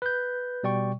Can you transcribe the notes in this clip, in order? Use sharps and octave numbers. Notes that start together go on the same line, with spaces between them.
B4 G6
B2 G3 D5 G5 C#6